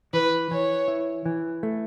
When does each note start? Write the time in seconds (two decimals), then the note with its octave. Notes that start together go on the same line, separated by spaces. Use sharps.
0.13 E3 B4
0.51 E3 C#5
0.88 E4
1.26 E3
1.63 A3